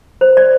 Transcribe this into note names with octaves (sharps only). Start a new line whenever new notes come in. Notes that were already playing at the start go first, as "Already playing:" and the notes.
C5
D5